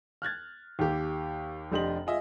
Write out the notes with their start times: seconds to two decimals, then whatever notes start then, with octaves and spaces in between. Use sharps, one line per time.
0.22 F6 F#6 G#6 A6
0.79 D#2 G4
1.72 F1 D4 G4 D#5 C6 F#7
2.07 F4 G#4 D#5 E5